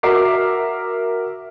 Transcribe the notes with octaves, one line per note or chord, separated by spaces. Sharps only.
F#4 A#4 E5 D6 C7